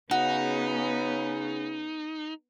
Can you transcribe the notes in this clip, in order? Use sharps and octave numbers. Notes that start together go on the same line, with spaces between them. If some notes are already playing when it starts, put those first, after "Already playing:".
C#3 B3 D#4 F#4